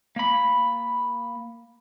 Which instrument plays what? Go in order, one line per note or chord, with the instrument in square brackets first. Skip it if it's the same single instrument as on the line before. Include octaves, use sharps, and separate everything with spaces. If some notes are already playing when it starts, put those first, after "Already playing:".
[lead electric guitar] A#3 B5